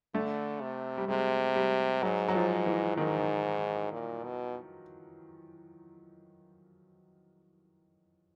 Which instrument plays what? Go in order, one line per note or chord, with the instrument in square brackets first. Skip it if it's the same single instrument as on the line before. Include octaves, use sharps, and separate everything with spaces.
[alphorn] D3 [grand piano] A3
[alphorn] C3
[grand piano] G3
[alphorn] C3 [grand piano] G#3
[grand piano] G3
[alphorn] G#2 [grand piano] F#3
[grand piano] F#3
F3
E3
[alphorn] G#2 [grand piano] D#3
[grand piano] D#3
[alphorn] A#2
B2